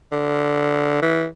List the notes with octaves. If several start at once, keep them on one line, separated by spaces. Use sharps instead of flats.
D3
E3